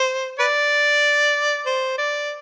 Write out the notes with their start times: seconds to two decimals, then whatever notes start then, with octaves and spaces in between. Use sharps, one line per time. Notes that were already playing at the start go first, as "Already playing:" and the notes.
Already playing: C5
0.39 B4 D5
1.66 C5
1.98 D5